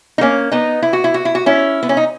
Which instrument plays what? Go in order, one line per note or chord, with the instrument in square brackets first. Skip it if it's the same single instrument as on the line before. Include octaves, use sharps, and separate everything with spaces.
[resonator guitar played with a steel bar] D#4
A#3 C#4
B3 D#4
E4
F#4
E4
F#4
E4
F#4
C#4 E4
B3
C#4
D#4